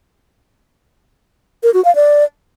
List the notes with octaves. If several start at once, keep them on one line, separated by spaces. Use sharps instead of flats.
A#4
F#4
F5
D5